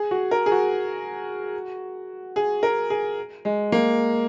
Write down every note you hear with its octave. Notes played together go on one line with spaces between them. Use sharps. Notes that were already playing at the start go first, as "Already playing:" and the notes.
Already playing: G#4
F#4
A#4
G#4
F#4
G#4
A#4
G#4
G#3
A#3